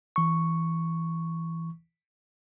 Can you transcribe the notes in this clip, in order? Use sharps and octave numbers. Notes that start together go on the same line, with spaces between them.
E3 C#6